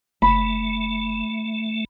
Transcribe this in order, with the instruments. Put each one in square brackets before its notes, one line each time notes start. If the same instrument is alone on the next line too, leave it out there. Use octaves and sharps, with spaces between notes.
[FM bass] F#1 [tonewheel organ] A3 [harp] B5